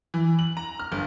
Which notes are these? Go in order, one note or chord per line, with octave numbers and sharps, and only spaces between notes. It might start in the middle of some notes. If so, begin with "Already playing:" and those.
E3
F#7
A#5
F6
G1